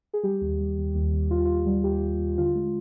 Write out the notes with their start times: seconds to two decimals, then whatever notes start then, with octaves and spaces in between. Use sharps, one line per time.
0.14 G#4
0.23 G3 G4
0.41 D#2
0.59 G3
0.77 D#2
0.94 D#2
1.13 D#2
1.30 D#2 F4
1.45 D#2 F4
1.66 G3
1.84 D#2 G4
2.02 D#2
2.19 D#2
2.38 D3 F4
2.55 G#3